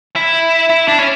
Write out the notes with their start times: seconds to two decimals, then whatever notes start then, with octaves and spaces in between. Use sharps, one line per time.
0.16 E4
0.70 E4
0.88 D4
0.99 C#4